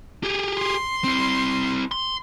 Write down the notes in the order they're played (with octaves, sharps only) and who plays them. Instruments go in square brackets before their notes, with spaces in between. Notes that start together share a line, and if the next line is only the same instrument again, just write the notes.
[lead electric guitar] G4 G#4
[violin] C6
[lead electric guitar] C4 E4
C6